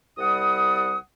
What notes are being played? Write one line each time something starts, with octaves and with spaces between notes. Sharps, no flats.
C2 G3 F#5 D#6